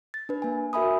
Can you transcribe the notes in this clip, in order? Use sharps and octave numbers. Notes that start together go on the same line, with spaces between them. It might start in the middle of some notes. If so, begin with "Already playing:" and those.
A6
D4 B4
A#3 G#5
F#4 A#4 E5 G#5 B5 D#6